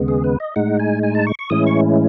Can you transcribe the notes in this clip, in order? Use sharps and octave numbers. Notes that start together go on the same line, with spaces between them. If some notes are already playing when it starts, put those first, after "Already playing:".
Already playing: D#2 C#3 G#3 B3
G#4
B4
D#5
A2 G#3 D#4 F#5
G#5
G#5
A5
C#6
C#6
A2 E3 G#3 C#4 E4 D#6
C#6